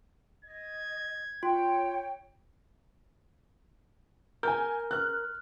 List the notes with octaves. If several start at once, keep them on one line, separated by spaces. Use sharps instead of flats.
D#5 G#6
F4 C#5 G5
A#4 G#5 G6
F6 F#6